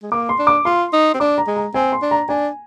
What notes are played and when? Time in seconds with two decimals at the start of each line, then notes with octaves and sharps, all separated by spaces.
0.03 G#3
0.12 A#3 D6
0.29 C6
0.39 D4
0.47 D6
0.65 F4 C6
0.93 D#4
1.14 C4
1.20 D4 D6
1.38 A#5
1.47 G#3
1.56 A#5
1.74 C4 G#5
1.92 C6
2.02 D4
2.11 A#5
2.29 D4 G#5